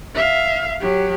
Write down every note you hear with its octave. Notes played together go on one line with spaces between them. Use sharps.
E5 F5
F#3 G4